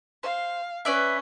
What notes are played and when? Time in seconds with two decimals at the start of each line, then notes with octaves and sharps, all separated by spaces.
0.23 C5 F5
0.85 C#4 B4 D5 E5